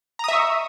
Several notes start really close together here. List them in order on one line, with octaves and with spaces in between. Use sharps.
A#5 D#6 E5 C#6